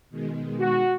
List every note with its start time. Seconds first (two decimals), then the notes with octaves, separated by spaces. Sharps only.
0.10 B2 D#3 G#3
0.60 F#4